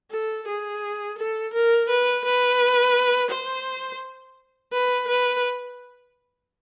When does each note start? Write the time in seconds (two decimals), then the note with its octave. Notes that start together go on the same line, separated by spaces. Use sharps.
0.11 A4
0.47 G#4
1.18 A4
1.53 A#4
1.89 B4
2.25 B4
3.30 C5
4.72 B4
5.08 B4